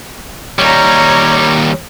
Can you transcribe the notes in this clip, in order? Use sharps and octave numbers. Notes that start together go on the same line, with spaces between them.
D#2 G3 C#5 A#5